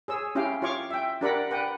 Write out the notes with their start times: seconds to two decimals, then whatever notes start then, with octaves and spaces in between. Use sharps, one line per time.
0.08 G#4 C#5 E6
0.35 C#4 E4 G4 F5 G5
0.62 F4 C#5 F5 C#6 D6
0.91 E5 G5
1.21 D4 G4 A#4 D5 F#5 B5
1.51 B4 F#5 G5